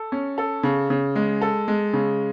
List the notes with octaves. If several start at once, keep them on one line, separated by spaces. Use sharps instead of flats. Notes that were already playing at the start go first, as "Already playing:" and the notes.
Already playing: A4
C#4
A4
C#3
C#3
G#3
A4
G#3
C#3